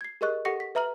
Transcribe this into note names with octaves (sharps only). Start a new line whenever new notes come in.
G#6 C7
G4 G#4 A#4 D#5 C#6 F#6
G4 A4 F#5 C#6 A#6 C#7
B6
B4 E5 A#5 F6 F#7